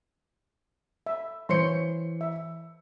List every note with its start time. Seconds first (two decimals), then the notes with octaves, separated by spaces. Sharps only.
1.06 E5
1.49 E3 C5 C#5 C6 C#7
2.21 E5